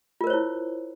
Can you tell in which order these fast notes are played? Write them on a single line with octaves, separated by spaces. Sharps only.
F4 A#4 C5 C#5 E4